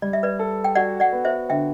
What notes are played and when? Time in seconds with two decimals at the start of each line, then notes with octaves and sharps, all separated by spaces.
0.02 G3 D5
0.13 E5
0.23 B4 D5
0.39 A4
0.64 G5
0.75 F#4 D5 F#5
1.00 D5 F#5
1.13 B3
1.25 C5 E5
1.49 D3 E5 G5